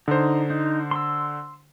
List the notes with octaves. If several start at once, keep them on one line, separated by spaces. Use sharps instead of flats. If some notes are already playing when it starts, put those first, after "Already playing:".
D3 D#4 C5
D#4
C6 E6